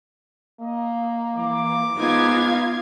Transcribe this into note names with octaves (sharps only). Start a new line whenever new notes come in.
A#3 D#5
E3 D6
G#2 B3 D#4 F4 F5 G#6